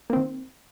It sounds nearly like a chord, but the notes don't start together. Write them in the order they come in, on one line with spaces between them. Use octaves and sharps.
A#3 C4 D#3